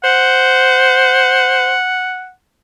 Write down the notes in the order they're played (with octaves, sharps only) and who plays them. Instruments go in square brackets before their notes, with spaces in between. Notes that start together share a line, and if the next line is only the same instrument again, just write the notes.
[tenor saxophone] C5 [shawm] F#5